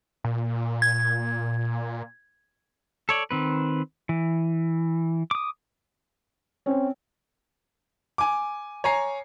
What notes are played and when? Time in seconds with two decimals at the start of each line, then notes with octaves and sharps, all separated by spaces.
0.24 A#2
0.82 G#6
3.09 A4 C#5 D5
3.31 D#3 C4 B4
4.09 E3
5.31 D6 D#6
6.66 C4 C#4
8.18 G#5 D6
8.84 C#5 G#5 A#5 C7